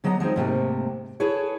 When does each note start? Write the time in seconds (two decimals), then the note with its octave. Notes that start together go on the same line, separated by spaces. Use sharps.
0.04 D3 F#3 B3 D#5 G#5 A#5
0.20 F3 G#3 C4 D#4
0.36 G#2 C3 A3 A#3
1.20 E4 G#4 A4 B4 C#5